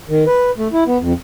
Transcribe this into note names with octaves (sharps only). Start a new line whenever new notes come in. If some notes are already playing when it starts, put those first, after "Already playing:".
D#3
B4
A3
E4
B3
F2